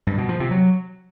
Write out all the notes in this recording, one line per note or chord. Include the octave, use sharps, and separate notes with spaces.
G2
B2
F3
C3
F#3